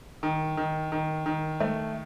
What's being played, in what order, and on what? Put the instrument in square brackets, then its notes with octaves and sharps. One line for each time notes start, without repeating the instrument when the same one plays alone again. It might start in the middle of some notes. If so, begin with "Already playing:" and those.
[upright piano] D#3
D#3
D#3
D#3
A3